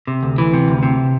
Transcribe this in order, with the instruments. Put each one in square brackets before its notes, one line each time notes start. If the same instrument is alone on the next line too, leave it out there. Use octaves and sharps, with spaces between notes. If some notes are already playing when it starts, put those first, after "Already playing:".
[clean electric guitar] C3
D2
E3
C3
D2
C3